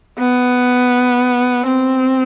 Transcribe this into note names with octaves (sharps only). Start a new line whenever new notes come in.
B3
C4